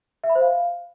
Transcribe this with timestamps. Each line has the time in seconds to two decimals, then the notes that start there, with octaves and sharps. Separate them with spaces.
0.24 E5
0.29 B5
0.35 C5
0.41 F5